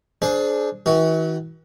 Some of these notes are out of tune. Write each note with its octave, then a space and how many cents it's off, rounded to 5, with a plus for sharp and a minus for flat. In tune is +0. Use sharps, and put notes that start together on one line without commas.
D4 +0 G#4 +30 C5 +0
E3 -40 F#4 +15